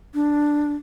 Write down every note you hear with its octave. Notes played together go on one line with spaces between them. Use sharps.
D4